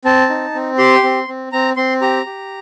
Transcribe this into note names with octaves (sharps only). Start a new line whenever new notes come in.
C4 A5
D#4
C4
G4 C6
C4
C4
C4 A#5
C4 C6
G4 A#5
G4